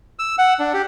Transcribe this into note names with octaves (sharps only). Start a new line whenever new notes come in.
E6
F#5
D4
G4